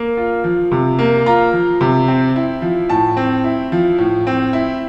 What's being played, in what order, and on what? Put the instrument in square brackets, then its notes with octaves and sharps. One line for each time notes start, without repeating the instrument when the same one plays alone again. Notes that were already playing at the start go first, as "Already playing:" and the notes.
Already playing: [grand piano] A#3
F4
F3
C3
A#3
F4 A#5
F3
C3
C4
E4
F3
A2 A5
C4
E4
F3
A2
C4
E4